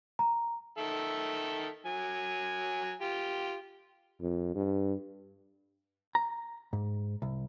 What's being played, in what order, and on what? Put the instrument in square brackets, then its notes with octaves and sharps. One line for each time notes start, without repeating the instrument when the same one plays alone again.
[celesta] A#5
[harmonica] D#3 A4 E5
F#3 G#5
F4 G4
[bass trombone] F2
G2
[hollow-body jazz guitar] A#5
G#2
C2